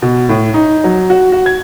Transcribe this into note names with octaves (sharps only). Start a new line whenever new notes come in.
B2
A2
D#4
F#3
F#4
F#4
G#6